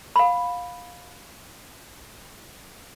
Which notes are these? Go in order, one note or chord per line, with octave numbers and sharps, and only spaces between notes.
F5 B5